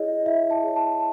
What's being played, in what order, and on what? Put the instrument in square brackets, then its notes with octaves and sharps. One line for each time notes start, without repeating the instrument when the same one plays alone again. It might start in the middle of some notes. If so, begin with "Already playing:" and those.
Already playing: [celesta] E4 G#4 C#5 D#5
E4 E5
A5
G#4 C#5
A5